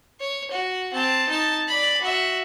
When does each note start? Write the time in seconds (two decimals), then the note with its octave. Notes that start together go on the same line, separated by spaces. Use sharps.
0.20 C#5
0.51 F#4
0.94 C4 A5
1.29 D#4 A5
1.68 D5 B5
2.02 F#4 E5